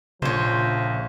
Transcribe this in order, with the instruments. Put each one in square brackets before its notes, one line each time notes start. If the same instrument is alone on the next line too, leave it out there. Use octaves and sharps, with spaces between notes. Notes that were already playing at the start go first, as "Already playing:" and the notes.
[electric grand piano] A#1 [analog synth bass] C#3 [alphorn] F3 [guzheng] C5 C#5